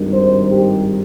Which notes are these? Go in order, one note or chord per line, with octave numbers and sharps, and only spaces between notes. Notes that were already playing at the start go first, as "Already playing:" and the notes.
Already playing: G#1 G2 D#3
C5
G4